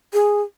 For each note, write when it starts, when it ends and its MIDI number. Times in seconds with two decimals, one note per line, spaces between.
0.13 0.42 68